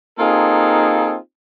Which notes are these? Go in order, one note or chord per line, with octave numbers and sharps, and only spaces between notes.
A#3 C4 D#4 F4 G#4 A4